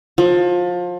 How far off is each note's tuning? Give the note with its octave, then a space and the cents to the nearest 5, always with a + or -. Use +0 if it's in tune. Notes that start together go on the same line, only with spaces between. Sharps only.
F3 +25